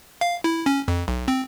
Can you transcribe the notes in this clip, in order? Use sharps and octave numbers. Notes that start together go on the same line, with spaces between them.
F5
E4
C#4
F2
B1
C4